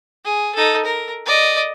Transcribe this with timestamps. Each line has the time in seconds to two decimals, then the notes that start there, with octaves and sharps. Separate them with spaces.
0.25 G#4
0.55 D#4 A4
0.85 A#4
1.26 D5 D#5